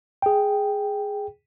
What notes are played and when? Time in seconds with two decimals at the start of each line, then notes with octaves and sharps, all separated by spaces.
0.22 G#4 G5